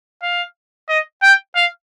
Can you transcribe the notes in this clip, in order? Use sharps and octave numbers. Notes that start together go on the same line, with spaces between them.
F5
D#5
G5
F5